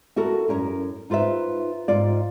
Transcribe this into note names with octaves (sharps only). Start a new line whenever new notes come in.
E4 F#4 A4 A#4
F#2 C#4 A#4 C#5
D#4 F4 B4 C5 E5
G#2 F4 D5